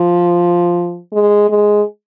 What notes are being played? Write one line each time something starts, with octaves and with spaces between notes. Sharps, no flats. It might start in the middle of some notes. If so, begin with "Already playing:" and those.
Already playing: F3
G#3
G#3